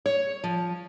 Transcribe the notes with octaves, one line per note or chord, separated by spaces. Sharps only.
C#5
F3